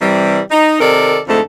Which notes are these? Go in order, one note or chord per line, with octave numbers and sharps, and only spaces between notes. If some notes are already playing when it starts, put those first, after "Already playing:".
C3 E3 G3
D#4
C3 D#3 A4 A#4 D5
F2 G#2 D3 A3 A4